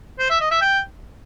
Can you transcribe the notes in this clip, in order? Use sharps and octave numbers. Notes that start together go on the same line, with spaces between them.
C5
E5
D#5
E5
G5